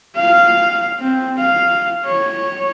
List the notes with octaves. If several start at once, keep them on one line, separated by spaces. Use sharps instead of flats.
F5
C4
F5
C#5